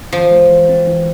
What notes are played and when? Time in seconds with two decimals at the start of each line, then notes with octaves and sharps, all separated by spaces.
0.12 E3 F3
0.31 G#3
0.51 E3
0.69 C4
0.88 E3